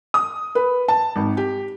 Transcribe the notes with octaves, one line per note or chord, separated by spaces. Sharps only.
D#6
B4
A5
G#1
G4